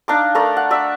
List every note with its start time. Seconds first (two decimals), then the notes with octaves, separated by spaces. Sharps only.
0.08 D4 D#4 F5 D6
0.35 A3 A#4 D5
0.57 F#5
0.71 D5 E5